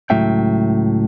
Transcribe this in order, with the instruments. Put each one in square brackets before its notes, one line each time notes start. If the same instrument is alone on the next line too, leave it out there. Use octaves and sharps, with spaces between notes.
[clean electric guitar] C#2 A2 F#3 E5 G5